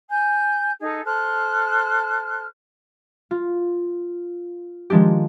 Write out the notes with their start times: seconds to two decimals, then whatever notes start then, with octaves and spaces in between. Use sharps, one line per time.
0.09 G#5 G6
0.79 D#4 G#4 A4
1.05 A4 C5 F6 F#6
3.31 F4
4.90 D#3 F3 G#3 D4 G4